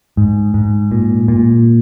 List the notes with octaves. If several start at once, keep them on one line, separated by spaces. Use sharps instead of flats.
G#2
G#2
A#2
A#2